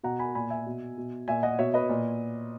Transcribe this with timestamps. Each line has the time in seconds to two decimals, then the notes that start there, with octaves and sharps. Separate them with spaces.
0.03 B2 F#5 A#5
0.19 G#5 B5
0.35 A#2 G#5 B5
0.50 E5 G#5
0.66 B2
0.98 B2
1.28 A#2 E5 G#5
1.43 D#5 F#5
1.59 B2 C#5 E5
1.74 B4 D#5
1.89 A#2